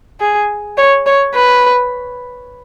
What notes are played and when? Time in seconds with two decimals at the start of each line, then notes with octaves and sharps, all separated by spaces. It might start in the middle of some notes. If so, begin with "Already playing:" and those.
0.20 G#4
0.77 C#5
1.06 C#5
1.35 B4